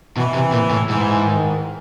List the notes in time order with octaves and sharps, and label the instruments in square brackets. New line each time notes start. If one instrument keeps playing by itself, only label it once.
[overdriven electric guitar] B2 [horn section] E3
[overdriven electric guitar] C3
A#2
A2
[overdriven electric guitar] G#2 [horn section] E3
[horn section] D#3